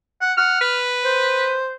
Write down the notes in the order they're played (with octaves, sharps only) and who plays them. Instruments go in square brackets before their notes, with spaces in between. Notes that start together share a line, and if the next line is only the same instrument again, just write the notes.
[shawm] F#5
[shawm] F#5 [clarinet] F6
[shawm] B4
[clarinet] C5